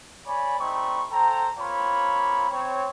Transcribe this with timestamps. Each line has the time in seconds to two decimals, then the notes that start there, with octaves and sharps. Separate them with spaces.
0.26 C#5 D5 G#5 B5
0.59 G3 A3 C4 D#4 B5 C#6
1.11 A4 C5 G5 A#5
1.58 A#3 C4 F4 C#5 B5
2.50 C4 C#5